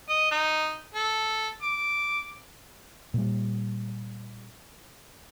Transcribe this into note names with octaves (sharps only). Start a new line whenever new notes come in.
D#5
D#4
A4
D6
A#2 G3